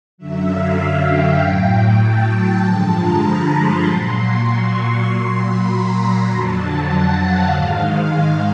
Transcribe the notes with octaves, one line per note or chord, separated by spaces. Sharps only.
F#2 D3 F#3 E5
F5
G5
A2 F#3
A5
G2 D3 F3 G#3
A#5
B5
C6
A#2 F#3
C6
C#6
C6
A#2 F#3
B5
A#5
F2 D3 F#3 A5
F#5
F5
G#2 D#3 G#3